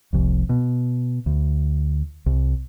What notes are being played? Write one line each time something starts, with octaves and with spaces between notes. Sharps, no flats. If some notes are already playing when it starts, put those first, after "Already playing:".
F1 C2 F2
B2
D2
C2